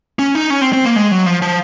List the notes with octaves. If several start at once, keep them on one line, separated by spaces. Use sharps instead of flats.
C#4
D#4
C#4
C4
C4
A#3
G#3
F#3
F3
F3